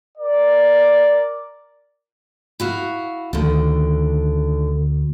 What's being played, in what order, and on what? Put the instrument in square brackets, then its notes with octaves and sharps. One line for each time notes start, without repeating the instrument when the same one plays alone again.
[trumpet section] A#4 D5
[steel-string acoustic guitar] E4 F#4 F5
[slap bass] D2 [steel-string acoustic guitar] D3 D#3